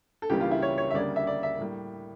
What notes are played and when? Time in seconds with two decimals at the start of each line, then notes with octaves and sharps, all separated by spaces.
0.22 A4
0.30 C#2 C#3 E3 G3 A#3 G4
0.41 F4
0.51 E4
0.62 C#5
0.78 C#5
0.90 E5
0.94 D2 C#3 G3 A#3 D5
1.16 E5
1.27 D5
1.43 E5
1.59 A2 G3 A#3